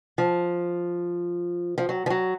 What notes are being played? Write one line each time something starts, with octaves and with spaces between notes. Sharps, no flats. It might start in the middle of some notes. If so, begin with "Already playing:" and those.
F3
F3
F#3
F3
F#3